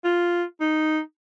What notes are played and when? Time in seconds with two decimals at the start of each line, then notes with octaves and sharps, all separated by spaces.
0.04 F4
0.60 D#4